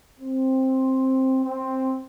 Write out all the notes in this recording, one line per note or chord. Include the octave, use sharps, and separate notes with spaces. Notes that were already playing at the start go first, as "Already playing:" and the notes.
C4
C4